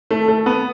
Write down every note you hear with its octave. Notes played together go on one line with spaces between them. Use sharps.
A3
A3
B3